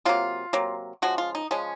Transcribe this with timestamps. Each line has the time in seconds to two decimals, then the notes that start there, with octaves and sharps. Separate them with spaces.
0.05 C3 F#3 A#3 F4
0.53 C3 F#3 A#3
1.02 C#3 F3 G#3 F#4
1.18 F4
1.35 D#4
1.51 C#3 F3 G#3 C#4